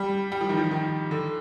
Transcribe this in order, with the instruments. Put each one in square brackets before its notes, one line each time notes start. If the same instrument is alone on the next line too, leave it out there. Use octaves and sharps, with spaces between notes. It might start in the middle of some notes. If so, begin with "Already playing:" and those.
Already playing: [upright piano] G3
G3
F3
D#3
F3
D#3
D3